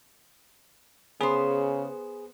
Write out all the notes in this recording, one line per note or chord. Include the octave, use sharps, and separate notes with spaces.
C#3 B3 G#4 C5